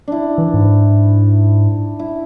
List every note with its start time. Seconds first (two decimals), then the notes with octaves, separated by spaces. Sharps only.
0.08 D4 E4
0.38 E3
0.54 G#2
1.99 E4